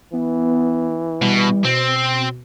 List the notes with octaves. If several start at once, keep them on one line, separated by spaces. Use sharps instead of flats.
E3 B3
B2 G3
B2 C4